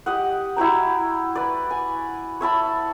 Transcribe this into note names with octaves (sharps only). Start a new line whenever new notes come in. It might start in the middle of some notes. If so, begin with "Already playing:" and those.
G4 D#5 F#5
E4 F#4 G5 A#5
B4 D5
G#5
C#5 E5 A5 B5